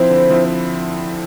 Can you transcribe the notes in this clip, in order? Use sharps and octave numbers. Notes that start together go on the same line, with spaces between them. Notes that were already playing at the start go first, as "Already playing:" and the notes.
Already playing: F3 C4 E4 C5
D3
F3 C4 E4